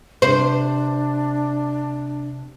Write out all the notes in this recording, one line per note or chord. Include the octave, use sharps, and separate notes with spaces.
C3 D4 C5